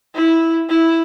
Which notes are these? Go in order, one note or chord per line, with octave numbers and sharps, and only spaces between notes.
E4
E4